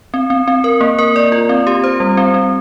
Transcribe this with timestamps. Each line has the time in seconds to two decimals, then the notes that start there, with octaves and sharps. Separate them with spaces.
0.14 C4
0.30 C4
0.48 C4
0.64 A#4
0.81 A#3
0.99 A#4
1.16 D5
1.32 F4
1.49 C4
1.67 G4
1.84 C5
2.00 G3
2.17 C4
2.34 C4